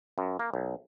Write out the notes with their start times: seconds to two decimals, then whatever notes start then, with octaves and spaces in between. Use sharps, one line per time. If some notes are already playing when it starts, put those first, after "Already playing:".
0.18 F#2
0.39 A#3
0.54 B1